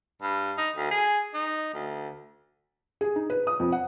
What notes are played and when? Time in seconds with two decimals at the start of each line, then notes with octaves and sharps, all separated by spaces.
0.22 G2
0.57 D#4
0.76 D2
0.91 G#4
1.34 D#4
1.74 D2
3.01 G#4
3.16 D#4
3.30 B4
3.47 D#6
3.60 F2
3.72 F#5